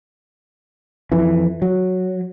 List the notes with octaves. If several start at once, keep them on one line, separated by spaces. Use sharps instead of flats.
F2 E3
F#3